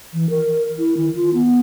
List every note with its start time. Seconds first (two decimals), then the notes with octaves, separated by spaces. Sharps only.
0.13 E3
0.30 A#4
0.78 E4
0.97 D#3
1.15 F4
1.34 B3